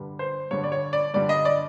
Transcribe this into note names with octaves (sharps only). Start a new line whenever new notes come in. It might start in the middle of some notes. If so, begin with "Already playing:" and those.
Already playing: G2 D3 G3
C5
G2 D3 G3 C#5
D5
C#5
D5
G2 D3 G3 D5
D#5
D5